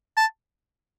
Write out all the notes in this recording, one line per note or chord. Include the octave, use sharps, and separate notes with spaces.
A5